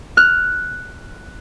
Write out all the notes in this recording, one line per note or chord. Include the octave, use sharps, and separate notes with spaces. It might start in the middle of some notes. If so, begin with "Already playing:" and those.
F6 F#6